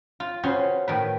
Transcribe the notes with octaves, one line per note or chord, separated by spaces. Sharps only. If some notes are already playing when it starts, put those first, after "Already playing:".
F4
C#3 C#4 F#4 B4 C5
A2 D#3 B4